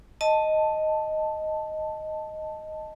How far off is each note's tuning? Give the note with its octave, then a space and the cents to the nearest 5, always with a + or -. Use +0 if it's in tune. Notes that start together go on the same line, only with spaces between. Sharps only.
D#5 +0 A5 +0